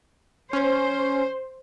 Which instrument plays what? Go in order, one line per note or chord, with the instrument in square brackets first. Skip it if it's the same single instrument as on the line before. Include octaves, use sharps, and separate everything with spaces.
[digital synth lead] C#4 [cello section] C5